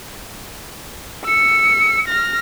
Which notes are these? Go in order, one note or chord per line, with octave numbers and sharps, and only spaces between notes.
E6 C#7
F6 A#6